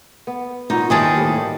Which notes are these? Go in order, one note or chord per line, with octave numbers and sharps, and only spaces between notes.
B3
A#2 D#3 D#4 F#4
D#2 D#3 E3 G3 C4 G#4 A5
A2 G3